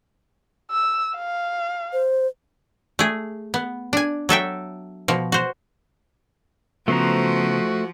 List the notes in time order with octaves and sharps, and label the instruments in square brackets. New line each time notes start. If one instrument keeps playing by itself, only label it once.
[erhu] E6
F5
[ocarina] C5
[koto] A3 G#4
B3
D4 G#5
F#3 A4 E5 G5
B2 F3
F#4 C5
[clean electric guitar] C#3 B3 [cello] F3 [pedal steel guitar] A3 C5 A#5 [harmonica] F#4